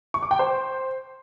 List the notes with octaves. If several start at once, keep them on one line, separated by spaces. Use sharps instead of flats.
C#6
D6
G5
C5